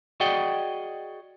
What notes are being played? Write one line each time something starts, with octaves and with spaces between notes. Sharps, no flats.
F#4 G#4 D5 D#5 F#5 G5